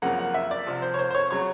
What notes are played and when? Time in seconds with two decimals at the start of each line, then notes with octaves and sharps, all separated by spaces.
0.02 F#2 C#3 F3 A#3 F#5
0.19 F#5
0.34 E5
0.51 D5
0.67 C2 C3 F3
0.82 C5
0.94 C#5
0.99 C5
1.11 C5
1.15 C#5
1.31 C#3 F#3 C#5